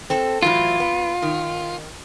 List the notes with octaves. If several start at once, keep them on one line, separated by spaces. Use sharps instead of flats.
C4 A4
A2 E3 F#3 F4
B3
D#3